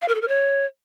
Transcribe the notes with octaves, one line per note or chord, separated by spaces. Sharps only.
F5
A#4
A4
A#4
C#5